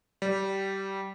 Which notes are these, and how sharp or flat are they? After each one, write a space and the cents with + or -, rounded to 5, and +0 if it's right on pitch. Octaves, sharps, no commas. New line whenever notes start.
G3 -15